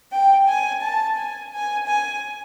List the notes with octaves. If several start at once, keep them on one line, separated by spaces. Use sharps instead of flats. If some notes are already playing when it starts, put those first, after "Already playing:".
G5
G#5
A5
G#5
G#5
G#5